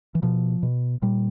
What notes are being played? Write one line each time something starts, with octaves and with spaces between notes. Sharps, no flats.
E3
B2 F3
B2
A#2 G3